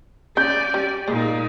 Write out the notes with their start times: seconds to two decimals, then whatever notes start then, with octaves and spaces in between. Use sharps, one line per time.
0.37 C#3 C#4 D5 G6
0.74 G3
1.08 A#2 G#3 D#4